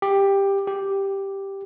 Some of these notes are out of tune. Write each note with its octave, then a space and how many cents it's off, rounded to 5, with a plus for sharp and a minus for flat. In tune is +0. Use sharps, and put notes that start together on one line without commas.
G4 +10
G4 +0